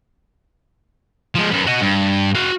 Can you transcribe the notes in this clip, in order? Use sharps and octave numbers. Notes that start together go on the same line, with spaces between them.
F3 G#3
F#2 B3
F#4 D#5
G2
F#4 F5